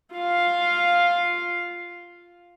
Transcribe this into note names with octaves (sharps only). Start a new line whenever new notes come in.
F4 F5